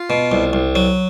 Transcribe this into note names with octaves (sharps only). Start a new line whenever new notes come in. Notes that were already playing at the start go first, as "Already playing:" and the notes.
Already playing: F4
B2
C2
C2
F#3